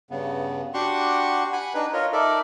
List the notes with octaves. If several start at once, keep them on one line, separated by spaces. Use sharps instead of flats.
G2 C#3 B3
D4 F#4 G4 F#5 C6 C#6
F#5 G#5 B5
D4 D#4 B4
F4 A#4 C#5 D#5
D#4 A4 A#4 D5 E5